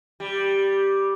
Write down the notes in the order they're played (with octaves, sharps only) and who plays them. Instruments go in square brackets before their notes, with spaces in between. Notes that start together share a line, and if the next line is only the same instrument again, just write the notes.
[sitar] G3